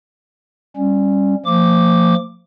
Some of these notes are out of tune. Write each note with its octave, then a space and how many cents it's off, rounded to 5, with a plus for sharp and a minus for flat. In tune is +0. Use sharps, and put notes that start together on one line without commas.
G3 +10 C#4 -10
F3 +0 A#3 -40 D6 +0